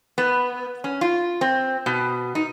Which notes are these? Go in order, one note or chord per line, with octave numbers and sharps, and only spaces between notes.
B3
C#4
F4
C4
B2
D#4